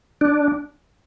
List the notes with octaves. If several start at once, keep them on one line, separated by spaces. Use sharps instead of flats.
D4